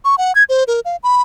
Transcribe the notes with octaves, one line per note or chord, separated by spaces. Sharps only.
C#6
F#5
G#6
C5
A#4
F5
B5